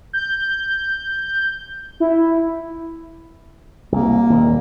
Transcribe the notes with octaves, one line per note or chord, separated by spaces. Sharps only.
G6
E4
C2 A#3
D#1 D#2